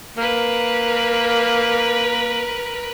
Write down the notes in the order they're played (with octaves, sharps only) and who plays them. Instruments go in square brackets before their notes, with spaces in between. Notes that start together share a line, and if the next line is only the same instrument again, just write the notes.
[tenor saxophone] A#3 [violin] A#4 B4